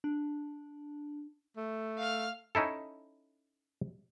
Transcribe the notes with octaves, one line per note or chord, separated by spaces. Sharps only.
D4
A3
F5 F6
C#4 D#4 E4 A4